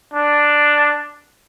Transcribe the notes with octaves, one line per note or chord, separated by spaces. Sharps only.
D4